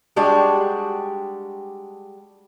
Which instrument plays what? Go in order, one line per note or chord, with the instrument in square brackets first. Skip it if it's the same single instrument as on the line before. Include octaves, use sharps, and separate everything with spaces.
[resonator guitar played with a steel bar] G3 G#3 D4 F#4 G4